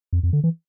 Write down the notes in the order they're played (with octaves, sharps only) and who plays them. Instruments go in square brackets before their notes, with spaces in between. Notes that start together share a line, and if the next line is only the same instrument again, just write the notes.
[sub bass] F2
F2
D3
E3